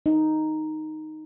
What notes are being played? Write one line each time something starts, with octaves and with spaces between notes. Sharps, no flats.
D#4